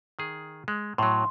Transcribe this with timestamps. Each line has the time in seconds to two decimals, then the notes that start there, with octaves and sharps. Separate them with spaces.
0.19 D#3 G#4
0.68 G#3
0.98 A2 F#3 C6